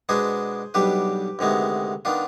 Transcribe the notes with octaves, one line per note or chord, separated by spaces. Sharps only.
B2 G#3 B3 D4 G#4 C5
B1 B2 G3 D4 G4 B4
D2 C3 D#3 G#3 B3
D#3 B3 D4 F4